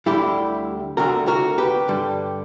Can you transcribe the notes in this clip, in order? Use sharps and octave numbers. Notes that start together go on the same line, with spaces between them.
D2 D3 G3 E4 G4
D2 D3 G3 F#4 A#4
F#4 A#4
G4 B4
G2 D3 G3